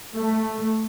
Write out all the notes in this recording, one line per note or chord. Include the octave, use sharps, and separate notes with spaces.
A3